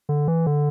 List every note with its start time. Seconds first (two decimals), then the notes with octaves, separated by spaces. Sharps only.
0.09 D3
0.28 E3
0.46 D3